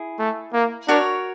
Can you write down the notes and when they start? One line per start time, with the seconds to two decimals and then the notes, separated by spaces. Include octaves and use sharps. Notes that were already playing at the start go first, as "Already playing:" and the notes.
Already playing: E4 G#4
0.19 A3
0.53 A#3
0.88 D4 F#4 A#4 C#5